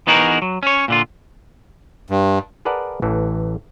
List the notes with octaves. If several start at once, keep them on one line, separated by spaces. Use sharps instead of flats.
E3 B3 D#4 F#4 G#4 A#4
F#3
C#4 C#5
A#2 D3 F4
G2
G#4 A#4 B4 D5 F#5 A5
A1 E3 A4